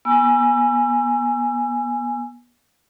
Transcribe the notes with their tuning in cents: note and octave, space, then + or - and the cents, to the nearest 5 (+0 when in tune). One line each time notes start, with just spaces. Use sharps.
B3 -30 G#5 +0 E6 +25